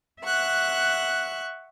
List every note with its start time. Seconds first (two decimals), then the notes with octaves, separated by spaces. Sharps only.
0.23 E5 F#5 C#6 F#6